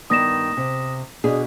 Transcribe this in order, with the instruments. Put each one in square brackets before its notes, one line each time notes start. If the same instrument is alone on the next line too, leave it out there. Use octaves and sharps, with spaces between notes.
[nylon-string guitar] G2 D#3 B3 [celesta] D#6 A#6 E7
[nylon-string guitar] C3
B2 D4 G#4